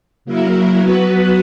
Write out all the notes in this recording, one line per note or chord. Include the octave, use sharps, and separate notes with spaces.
C#3 F#3 A#3 E4 A#4
F#3 B3 F#4 B4